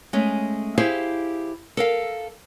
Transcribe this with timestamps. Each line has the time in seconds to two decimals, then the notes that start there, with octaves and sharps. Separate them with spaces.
0.13 G#3 A3 C#4
0.78 E4 G4 G#4 C5 F5
1.77 A4 A#4 F5